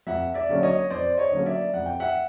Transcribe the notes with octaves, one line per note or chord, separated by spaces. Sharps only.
F2 E5 F#5
D5 E5
D3 F#3 A#3 C#4
C#5 D#5
F2 C5 D5
C#5 D#5
D3 F#3 A#3 C#4
D5 E5
F2 F#5
G5
E5 F#5